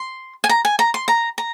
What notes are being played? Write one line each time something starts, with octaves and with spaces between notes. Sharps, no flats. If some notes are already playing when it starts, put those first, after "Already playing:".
Already playing: C6
G#5
A#5
G#5
A#5
C6
A#5
A#5